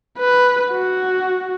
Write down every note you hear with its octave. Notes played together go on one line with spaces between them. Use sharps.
B4
F#4